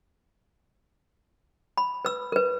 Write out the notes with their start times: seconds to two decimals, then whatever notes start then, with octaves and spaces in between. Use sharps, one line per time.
1.78 B5
2.05 B4 E6
2.32 A#4 B4